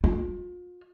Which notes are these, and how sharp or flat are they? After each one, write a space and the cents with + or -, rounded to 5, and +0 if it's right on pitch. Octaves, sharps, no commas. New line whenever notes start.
F4 +35